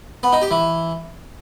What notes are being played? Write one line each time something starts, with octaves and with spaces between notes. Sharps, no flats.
B3
D#4
G4
E3